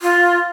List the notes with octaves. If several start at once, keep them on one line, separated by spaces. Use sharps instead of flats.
F4